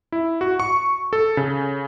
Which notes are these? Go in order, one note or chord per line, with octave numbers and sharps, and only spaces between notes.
E4
F#4
C#6
A4
C#3